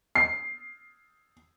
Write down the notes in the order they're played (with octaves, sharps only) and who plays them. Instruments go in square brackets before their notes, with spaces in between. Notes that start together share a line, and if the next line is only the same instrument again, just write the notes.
[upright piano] C7